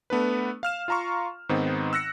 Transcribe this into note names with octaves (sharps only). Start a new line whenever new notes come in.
A3 B3 D4 B4
F5 F6 E7
F4 F5 A#5 C6 C#6
G#2 D#3 B3 C4 D#4
E6 F#6 A#6 C#7